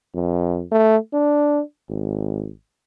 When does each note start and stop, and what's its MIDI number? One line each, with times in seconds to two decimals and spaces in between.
0.14 0.64 41
0.72 0.97 57
1.13 1.61 62
1.89 2.50 32